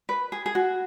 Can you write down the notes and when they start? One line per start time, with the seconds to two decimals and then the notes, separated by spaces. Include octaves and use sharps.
0.09 B4
0.32 G#4
0.46 G#4
0.55 F#4